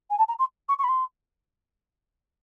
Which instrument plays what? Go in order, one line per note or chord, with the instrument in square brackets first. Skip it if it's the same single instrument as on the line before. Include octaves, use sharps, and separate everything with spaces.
[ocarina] G#5
A5
A#5
C6
C#6
C#6
B5
C6